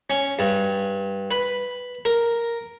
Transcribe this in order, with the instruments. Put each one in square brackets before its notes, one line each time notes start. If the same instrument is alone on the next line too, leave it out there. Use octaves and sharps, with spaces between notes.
[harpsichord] C#4
G2
B4
A#4